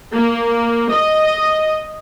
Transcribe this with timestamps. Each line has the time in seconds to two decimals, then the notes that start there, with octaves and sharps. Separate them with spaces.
0.15 A#3
0.92 D#5